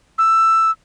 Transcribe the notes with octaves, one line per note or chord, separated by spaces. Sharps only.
E6